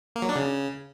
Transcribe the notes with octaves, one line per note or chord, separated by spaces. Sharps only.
A#3
F#3
D4
C#3